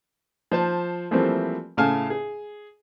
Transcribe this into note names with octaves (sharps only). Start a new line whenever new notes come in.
F3 C5 A5
E3 F3 G3 A3 A#3 C4
A2 C#3 F5 G#5 A5 F6
G#4